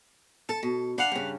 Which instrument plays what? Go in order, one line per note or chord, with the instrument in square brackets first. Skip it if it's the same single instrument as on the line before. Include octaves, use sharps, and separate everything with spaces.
[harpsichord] A4 [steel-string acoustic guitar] A5
[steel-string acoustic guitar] B2
[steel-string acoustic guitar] D4 [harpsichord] F5 F#5 B5
[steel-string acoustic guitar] G2 C#3